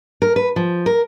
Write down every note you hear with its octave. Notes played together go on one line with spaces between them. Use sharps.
A#4
B4
F3
A#4